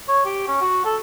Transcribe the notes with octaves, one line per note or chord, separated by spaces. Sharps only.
C#5
G4
C#4
F#4
A4